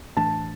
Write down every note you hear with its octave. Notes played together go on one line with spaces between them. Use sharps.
A2 E3 A3 D4 A5